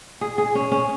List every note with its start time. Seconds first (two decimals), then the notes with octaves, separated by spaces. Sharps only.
0.21 G#4
0.38 G#4
0.55 C#4
0.72 C#4